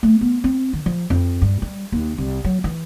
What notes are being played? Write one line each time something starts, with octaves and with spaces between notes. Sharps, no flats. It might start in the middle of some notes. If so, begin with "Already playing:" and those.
A3
B3
C4
D#3
F3
F2
G2
G3
D#2
C2
F#3
E3